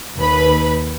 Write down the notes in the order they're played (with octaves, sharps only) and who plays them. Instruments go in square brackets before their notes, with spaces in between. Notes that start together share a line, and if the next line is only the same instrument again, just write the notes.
[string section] D#2 B4 B5